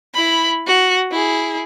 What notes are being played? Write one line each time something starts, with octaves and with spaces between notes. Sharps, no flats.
E4 B5
F#4
E4 G#4